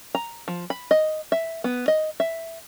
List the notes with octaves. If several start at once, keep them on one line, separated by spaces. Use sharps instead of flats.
A#5
F3
B5
D#5
E5
B3
D#5
E5